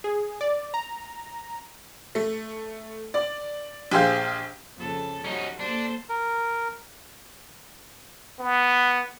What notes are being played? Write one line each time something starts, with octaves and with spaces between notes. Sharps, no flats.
G#4
D5
A#5
A3
D5
A#1 G4 G#4 C5 F5 G6
F2 C#3 A4
G3 C#4 D#4 F#4
A#3 D4 A4 C5
A#4
B3